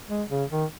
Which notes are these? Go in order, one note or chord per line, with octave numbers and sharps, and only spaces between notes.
G#3
C#3
D#3